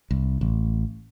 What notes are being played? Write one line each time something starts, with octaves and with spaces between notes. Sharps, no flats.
C2
A1